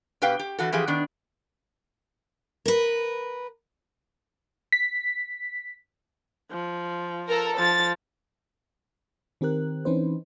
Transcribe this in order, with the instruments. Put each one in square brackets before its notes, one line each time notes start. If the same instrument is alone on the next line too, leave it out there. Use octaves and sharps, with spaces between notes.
[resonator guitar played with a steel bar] B2 G4 B4 F5 G5
G4
E3 F#4 A4
E3 F3 G4 G#4
D#3 B3 D4
[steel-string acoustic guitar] A#4 B4
[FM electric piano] B6
[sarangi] F3
[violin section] A4 A#4
[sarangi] F3 [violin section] A6
[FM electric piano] D#3 C4 G4 A#4 F#6
E3 C4 C#4 D#4 B4 C5